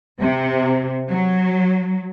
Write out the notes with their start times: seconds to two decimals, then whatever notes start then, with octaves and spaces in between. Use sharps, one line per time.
0.20 C3
1.10 F#3